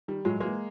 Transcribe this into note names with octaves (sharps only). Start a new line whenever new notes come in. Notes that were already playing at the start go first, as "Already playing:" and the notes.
D#3 G3
A2 F#3 G#3
E3 G#3 A#3